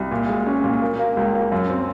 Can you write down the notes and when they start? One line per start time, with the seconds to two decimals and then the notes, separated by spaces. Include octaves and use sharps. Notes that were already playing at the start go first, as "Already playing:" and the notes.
Already playing: C2
0.11 A#2
0.29 G#3
0.47 C#4
0.64 A#2
0.82 A#3
0.99 A#3
1.17 C#2
1.35 A#3
1.52 F#2
1.70 C4